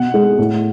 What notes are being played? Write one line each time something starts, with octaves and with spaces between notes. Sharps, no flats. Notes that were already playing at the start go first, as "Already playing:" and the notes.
Already playing: B2 F#5
G#3
A2